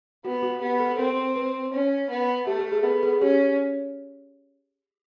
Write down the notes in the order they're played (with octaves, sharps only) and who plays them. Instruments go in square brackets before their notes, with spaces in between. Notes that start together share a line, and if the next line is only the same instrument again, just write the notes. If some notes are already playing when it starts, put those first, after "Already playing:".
[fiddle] B3 [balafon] F#4
[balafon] F#4
[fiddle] B3 [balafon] G4
[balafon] A4
[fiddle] C4 [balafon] A#4
[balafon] B4
[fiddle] C#4
B3
[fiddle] A3 [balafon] G4
[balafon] A4
G#4
[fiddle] B3 [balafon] A4
[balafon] G#4
[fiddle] C#4 [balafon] G4